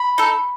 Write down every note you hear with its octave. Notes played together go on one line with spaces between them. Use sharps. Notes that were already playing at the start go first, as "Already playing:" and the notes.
Already playing: B5
D#4 A4